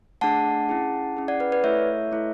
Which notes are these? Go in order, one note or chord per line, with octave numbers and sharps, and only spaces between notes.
A3 D4 G#4 F#5 A5
C#4 E4 G#4
C#4 E4 G#4
D5 F#5
B4 D5
B4 D5
A3 E4 A4 C#5 E5
A3 E4 A4